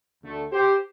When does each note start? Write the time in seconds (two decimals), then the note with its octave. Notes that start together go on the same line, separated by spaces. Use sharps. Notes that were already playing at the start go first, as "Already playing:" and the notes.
0.23 D2 D3 A3
0.52 G4 C5